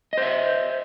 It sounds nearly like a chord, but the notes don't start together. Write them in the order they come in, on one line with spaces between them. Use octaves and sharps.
D#5 C5 E5